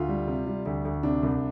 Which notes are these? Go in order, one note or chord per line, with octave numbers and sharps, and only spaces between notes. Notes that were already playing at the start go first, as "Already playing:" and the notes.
Already playing: D2 F4
G3
C3
G3
D2
D2
C3 D4
C2